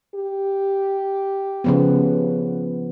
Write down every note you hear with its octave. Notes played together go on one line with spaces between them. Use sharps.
G4
C#3 F3 B3